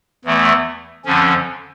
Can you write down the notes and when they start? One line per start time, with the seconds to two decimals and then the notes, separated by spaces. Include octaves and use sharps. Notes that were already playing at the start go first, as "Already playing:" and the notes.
0.25 E2 E3 A3
1.05 F2 D3 F3 C#4